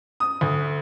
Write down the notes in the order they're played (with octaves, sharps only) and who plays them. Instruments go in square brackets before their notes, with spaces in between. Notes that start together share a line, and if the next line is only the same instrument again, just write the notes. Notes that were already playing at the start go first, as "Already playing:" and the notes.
[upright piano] D#6
D2